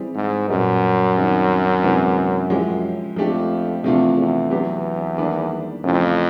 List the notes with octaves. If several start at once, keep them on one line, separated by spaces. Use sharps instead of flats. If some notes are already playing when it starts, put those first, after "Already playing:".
Already playing: E3 G3 C4 E4 G#4
G#2
F#2 A#2 G3 B3
D#3 G3 C4 D#4
C3 E3 G#3 B3 D4
F3 G#3 C#4 E4 G4
F2 F3 A3 D4 G4
E2 C3 F3 A3 D4 F4
E2
F#3 B3 D4 G4
D#3 G3 A#3 D4 G4
F2 C#3 E3 A3 C#4 E4